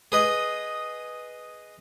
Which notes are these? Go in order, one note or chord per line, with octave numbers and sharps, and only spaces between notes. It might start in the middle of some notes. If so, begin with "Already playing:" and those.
G#4 B4 D#5